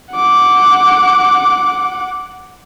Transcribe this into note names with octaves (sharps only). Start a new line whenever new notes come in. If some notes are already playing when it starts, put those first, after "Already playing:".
F#5 D6